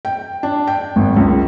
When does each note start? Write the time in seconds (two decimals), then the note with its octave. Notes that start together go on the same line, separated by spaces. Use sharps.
0.05 G5
0.43 D4
0.67 G5
0.96 G#1
1.17 C#2